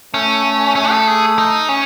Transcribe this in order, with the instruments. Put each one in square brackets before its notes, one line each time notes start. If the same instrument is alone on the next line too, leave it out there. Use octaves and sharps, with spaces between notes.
[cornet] A3 [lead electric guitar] C#4
[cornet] A3
[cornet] A3 [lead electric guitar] C#4
[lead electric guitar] A4
G#4
D#4
C#4